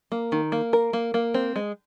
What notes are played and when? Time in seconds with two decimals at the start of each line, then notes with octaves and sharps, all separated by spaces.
0.12 A#3
0.32 D#3
0.52 A#3
0.73 A#4
0.93 A#3
1.14 A#3
1.34 C4
1.56 G#3